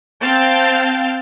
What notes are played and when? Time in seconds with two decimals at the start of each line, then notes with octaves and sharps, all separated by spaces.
0.22 C4 F5 G5 A5